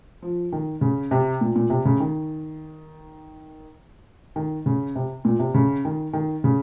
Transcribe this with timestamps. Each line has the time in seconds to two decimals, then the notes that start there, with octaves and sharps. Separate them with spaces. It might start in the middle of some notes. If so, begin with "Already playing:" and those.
0.22 F3
0.52 D#3
0.81 C#3
1.11 C3
1.41 A#2
1.56 A#2
1.70 C3
1.85 C#3
2.00 D#3
4.36 D#3
4.66 C#3
4.96 C3
5.25 A#2
5.39 C3
5.54 C#3
5.85 D#3
6.13 D#3
6.44 C#3